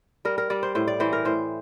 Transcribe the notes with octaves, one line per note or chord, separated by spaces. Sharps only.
G3 A#4
A#4
G3 D5
C5
A2 C5
D5
E3 C5
A#4
A2 C5